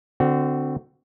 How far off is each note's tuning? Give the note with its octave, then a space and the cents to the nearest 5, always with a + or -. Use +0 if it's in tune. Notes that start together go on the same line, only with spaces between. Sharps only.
D3 +0 C4 -25 F#4 +0